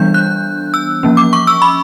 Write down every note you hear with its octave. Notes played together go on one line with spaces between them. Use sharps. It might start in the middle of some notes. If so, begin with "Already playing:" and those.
Already playing: E3 G3 B3 D4 G6
F#6
E6
F3 A#3 C#4
D6
C#6
E6
B5